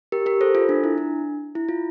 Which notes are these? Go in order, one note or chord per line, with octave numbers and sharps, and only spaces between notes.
G4 A#4
G4 A#4
A4 C5
F4 A4
D4
E4
D4
E4
F4